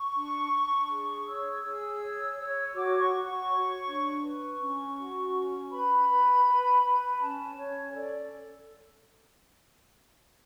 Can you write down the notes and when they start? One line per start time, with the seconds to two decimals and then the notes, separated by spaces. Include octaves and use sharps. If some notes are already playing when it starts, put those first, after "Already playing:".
Already playing: C#6
0.15 D4
0.51 D4
0.89 G#4
1.26 C#5 E6
1.63 G#4
2.01 C#5
2.37 C#5
2.74 F#4 D6
2.99 C#6
3.11 F#4
3.24 C#6
3.49 C#5
3.86 D4
4.22 B4 C#6
4.60 C#4
4.97 F#4
5.34 C#4
5.71 B4 B5
6.08 B4
6.46 B4
6.83 B4
7.20 C#4 A5
7.57 C#4 C#5
7.94 A4 D5